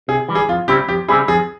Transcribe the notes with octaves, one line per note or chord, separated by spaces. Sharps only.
C3 G#4
E3 G3
G#4
F2 F4
C#3 G3 C4 E4 G4
F2 G4
C#3 G3 C4 E4 G#4
F2 G#4